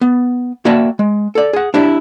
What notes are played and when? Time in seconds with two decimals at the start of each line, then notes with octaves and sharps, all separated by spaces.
0.01 B3
0.65 A#3 F#4 D5 E5 G5 A5
0.99 G#3
1.35 A4 D5
1.53 G#4 F#5
1.74 D4 E4 G4 D5 E5